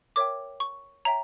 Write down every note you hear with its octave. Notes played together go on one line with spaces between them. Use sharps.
A#4 C#5 E5 G5 D6
C#6
C#5 E5 G5 A#5